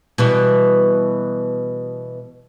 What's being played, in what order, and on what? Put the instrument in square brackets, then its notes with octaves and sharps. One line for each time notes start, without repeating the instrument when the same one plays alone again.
[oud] B2 E3 G3